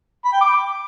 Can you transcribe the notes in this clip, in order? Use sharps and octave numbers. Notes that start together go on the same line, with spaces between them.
B5
G5
D6